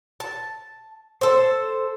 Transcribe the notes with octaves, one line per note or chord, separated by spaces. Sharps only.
A5
A4 C5